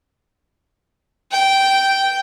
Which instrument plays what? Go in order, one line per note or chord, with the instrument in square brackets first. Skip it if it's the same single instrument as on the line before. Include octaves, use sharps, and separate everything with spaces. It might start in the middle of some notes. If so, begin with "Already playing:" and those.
[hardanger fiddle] G5